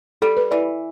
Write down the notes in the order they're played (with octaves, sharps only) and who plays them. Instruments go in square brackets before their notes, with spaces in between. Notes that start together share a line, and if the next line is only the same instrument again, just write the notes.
[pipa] G3 [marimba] A4
[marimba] B4
[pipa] E3 [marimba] D5